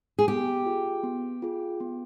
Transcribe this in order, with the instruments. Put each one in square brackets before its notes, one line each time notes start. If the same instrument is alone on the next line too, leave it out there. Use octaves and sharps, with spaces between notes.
[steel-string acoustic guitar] G#4
[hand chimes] B3 [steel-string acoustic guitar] G4
[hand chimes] F4 G#4
B3
F4 G#4
B3